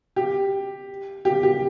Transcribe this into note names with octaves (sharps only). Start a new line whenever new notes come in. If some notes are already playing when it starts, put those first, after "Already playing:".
G4
G4
G4